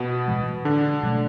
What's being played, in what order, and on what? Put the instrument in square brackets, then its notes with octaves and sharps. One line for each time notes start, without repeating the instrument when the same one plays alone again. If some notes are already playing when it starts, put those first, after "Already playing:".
Already playing: [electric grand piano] B2 B3
[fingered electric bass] A2 E3 G#3
[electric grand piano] D3 D4
[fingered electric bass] B2 F#3 A3